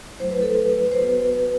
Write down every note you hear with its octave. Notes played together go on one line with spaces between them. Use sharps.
F#3 A3 E4 C5
B4
A4
B4
C5
B3 F#4 B4